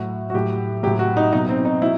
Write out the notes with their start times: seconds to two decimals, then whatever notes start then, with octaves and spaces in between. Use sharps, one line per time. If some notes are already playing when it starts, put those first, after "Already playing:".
Already playing: A2 F#3 F#4
0.30 F#4
0.34 A2 F#3 G4
0.83 F#3 G4
0.87 A2
0.99 F#4
1.17 D#4
1.32 B2 F#3 D#4
1.49 C4
1.65 D#4
1.82 F#3 E4